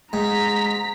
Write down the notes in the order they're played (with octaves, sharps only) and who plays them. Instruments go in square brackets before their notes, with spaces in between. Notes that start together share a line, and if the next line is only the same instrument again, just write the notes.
[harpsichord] G#2 [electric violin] A#5 B6